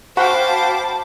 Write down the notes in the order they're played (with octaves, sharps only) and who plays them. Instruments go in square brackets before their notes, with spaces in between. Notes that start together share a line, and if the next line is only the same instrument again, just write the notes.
[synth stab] F#4 [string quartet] C5 D6 [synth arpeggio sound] F5 G5 B5 [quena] A5